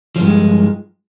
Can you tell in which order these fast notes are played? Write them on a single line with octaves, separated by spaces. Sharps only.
F3 G2 G#3